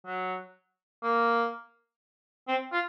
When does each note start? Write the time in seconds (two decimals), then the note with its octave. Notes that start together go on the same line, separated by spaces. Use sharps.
0.06 F#3
1.03 A#3
2.48 C4
2.72 F4